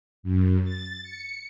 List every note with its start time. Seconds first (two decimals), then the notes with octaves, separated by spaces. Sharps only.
0.23 F#2
0.64 A6
1.03 C#7